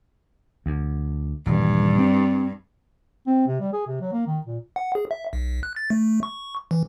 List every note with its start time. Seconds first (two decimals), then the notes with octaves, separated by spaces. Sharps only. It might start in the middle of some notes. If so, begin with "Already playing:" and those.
0.66 D2
1.46 D#1 G2 E3
1.99 C4
3.26 C4
3.47 C3
3.60 G3
3.73 G#4
3.87 C3
4.01 F#3
4.12 A#3
4.27 D#3
4.47 A#2
4.76 F#5
4.95 G#4
5.11 E5
5.33 B1
5.63 F#6
5.76 A6
5.90 A3
6.23 C#6
6.71 E3